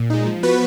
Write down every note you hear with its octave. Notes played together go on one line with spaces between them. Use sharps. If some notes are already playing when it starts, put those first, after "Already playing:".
Already playing: A#2
G#3 D#4
F3
B3 F#4 B4